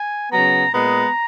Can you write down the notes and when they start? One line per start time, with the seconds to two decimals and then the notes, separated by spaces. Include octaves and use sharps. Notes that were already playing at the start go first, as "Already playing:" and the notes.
Already playing: G#5
0.31 C#3 F#3 B3 A#5
0.73 A#2 G#3 B3 A#5